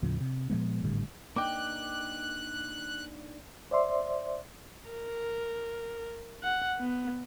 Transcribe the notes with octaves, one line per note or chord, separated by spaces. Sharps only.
D#2 A2 C#3 F3
C3
A#2 F3 G#3 B3
G#1 A2 D3 G3
A#3 D4 D#4 G5 D6 F#6
C5 D5 E5 C6
A#4
F#5
B3